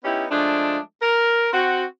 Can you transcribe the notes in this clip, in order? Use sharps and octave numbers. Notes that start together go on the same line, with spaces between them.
B3 C#4 D#4 E4 G4
F3 G#3 A3 D4
A#4
C4 F#4